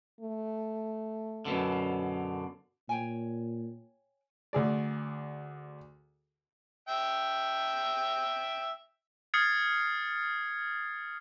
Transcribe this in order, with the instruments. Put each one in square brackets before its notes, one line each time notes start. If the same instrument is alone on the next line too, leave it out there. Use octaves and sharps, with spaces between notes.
[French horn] A3
[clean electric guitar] F#2 B2 D3
[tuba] A#2 [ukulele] C#5 G5 G#5
[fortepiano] D2 G#4 D5
[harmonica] E5 G5
[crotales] D#6 F6 G#6 A6 C7 C#7